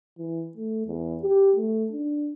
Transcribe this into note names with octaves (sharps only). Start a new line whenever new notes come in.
E3
A3
E2
G4
A3
D4